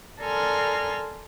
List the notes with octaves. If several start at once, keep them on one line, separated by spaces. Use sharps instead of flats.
A4 A#4 D5 G#5 C6 F6